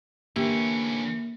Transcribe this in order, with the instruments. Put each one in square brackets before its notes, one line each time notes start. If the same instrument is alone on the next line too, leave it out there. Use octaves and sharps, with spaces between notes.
[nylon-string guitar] D3 G4 A#4 [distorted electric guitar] E3 C#4 [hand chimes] A#3